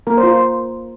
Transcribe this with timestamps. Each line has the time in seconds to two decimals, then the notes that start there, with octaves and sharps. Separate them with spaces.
0.07 A#3 A#4
0.18 C5
0.23 F4
0.28 C5